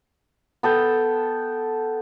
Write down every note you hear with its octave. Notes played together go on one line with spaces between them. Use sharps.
B3 A4 G5